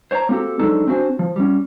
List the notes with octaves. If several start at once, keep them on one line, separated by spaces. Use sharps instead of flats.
C5 C#5 G5 A5 A#5
A#3 C4 F#4 G4 A4
F3 F#3 G#3 D4 D#4 A4
C4 D4 E4 F#4 C5 G#5
F3
G3 C#4